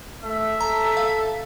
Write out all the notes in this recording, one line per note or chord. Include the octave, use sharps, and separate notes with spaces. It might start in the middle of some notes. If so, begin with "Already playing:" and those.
A3 E5
A4 A#5
F5